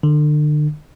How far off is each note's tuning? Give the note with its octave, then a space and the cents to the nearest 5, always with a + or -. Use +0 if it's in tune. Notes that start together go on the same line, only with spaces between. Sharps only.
D3 +35